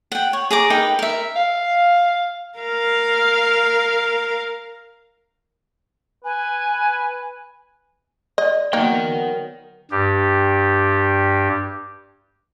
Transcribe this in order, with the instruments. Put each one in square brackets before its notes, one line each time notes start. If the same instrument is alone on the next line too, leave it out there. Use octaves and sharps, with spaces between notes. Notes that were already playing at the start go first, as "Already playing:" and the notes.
[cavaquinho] F#5 G5
C#5
G#4 A#5 D6
D#4 A#4 B4 G5
A#4 E5
[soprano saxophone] F5
[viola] A#4 F5
[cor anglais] B4 [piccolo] G#5
[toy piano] D5 [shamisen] D#5
[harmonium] F#3 B3 [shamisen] A#3 D#4 [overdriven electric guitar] A#4 G5
[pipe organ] G2 G4